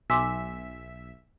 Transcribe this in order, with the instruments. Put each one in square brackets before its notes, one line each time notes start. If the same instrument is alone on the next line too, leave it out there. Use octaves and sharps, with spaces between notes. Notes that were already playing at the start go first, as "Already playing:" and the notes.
[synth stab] B1 E5 [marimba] G#5 C6 D6